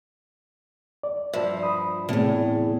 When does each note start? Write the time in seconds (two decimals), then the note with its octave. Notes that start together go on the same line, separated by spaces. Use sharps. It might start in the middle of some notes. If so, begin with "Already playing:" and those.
1.03 D5
1.33 G2 F3 E5
1.63 B5 D#6
2.09 E2 A2 C3 B3 G#4